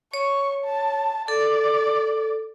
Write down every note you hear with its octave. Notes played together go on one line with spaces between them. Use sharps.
C#5 C#6
A5
A4 D5